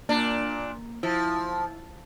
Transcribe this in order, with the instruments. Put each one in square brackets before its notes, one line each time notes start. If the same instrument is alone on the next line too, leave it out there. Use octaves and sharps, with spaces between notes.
[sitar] A#2 D4 [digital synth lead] A#3
[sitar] F3 [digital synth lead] E4